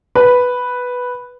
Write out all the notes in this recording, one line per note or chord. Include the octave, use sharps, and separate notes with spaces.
B4